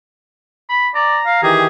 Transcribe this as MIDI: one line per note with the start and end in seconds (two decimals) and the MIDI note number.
0.69 0.88 83
0.95 1.19 74
0.95 1.48 82
1.26 1.39 77
1.43 1.67 51
1.43 1.67 52
1.43 1.67 67
1.43 1.67 68